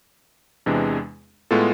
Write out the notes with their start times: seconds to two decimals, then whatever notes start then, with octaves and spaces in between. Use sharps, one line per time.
0.66 E2 C3 E3 G#3 D4
1.51 A2 G#3 B3 F4 A4